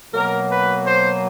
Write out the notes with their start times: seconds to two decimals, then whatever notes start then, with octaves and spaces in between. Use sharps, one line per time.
0.13 B2 F#3 A#3 A#4
0.49 B4
0.84 C5